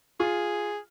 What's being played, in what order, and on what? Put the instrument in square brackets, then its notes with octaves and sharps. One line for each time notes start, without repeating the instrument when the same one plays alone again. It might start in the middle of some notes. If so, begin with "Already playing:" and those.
[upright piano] F4 [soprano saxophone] G#4